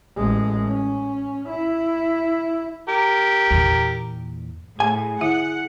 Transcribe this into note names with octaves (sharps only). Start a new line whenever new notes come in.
A1 G#3
C#4
E4
G4 A#4
E2 A#2
A2 G#4 G#5
D3 E4 E5 F#5